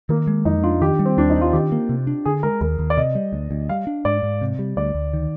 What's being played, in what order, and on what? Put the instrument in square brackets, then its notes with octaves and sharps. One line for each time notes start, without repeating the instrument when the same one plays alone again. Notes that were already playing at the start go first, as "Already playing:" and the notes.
[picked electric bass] D#3 [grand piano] A#3
[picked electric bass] G#3
[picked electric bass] F2 [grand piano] D#4
[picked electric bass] D4 [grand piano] F4
[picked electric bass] D#3 [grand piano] G4
[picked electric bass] G3
[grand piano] C4
[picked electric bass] D#2 [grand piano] D4
[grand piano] D#4
[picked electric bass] D4
[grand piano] F4
[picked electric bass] D#3 [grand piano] G4
[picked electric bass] A#3
C3
D4
[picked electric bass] D3 [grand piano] G#4
[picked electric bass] G#3 [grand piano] A#4
[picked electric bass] D#2 [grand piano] A#4
[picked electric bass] D#2
[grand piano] D5
[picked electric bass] C3 [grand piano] D#5
[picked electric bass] G3
D2
D2
[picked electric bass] G3 [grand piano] F5
[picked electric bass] D4
[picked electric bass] G#2 [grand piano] D5
[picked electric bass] G#2
C3
G3
[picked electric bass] D2 [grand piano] D5
[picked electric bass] D2
D#3